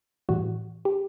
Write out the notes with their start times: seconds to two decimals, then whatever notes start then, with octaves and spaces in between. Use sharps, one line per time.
0.29 A2 E3 G3 F#4
0.85 G4